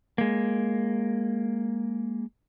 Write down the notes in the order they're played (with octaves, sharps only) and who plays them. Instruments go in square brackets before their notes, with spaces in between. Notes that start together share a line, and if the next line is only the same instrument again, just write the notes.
[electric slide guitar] G#3 A#3